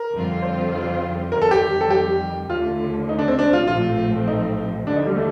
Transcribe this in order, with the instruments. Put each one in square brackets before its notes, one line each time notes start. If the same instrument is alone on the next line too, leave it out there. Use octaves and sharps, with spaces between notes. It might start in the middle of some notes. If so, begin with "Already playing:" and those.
Already playing: [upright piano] A#4
[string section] F2 D3 G3 C4 F4
[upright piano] C5
[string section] F2 D#3 G3 [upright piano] A#4
[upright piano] A4
G4
A4
G4
[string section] D#2 D3 A3 [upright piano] F4
[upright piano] D#4
D4
C4
D4
F4
[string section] A#1 A2 F3 A3 C4 [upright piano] F4
[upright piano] D#4
[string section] D#2 D3 F3 [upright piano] D4
[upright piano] D#4
G3
A3